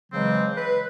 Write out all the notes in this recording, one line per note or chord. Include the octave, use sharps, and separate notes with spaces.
C#3 E3 F#3 G#3 C4
B4